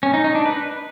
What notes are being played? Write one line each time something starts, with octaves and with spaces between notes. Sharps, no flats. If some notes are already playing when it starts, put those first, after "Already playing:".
C#4
D#4
D#4
D4
B4